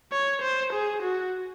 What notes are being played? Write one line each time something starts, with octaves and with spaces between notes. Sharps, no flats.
C#5
C5
G#4
F#4